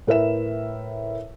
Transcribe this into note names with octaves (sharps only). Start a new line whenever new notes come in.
A2 A#4 B4 E5 E7